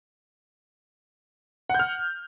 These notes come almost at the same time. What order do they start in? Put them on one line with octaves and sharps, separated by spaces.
F#5 G6 F6